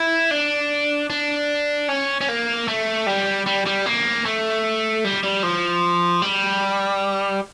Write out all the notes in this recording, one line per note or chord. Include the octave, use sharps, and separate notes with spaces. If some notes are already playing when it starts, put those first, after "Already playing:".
Already playing: E4
D4
D4
C#4
C#4
A#3
A3
G3
G3
G3
A#3
A3
G3
G3
F3
G3